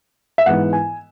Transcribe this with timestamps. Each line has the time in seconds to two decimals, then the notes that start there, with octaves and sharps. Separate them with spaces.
0.38 E5
0.46 G#2 E3 B3 F#5
0.73 G#5